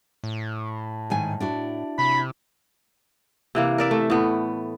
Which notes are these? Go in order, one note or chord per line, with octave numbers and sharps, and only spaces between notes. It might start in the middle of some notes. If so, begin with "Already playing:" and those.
A2
G#2 D#3 G#5
D4 E4 F#4
C3 B5
C3 E3 A#3
A#4 D5 E5
A3
A2 B3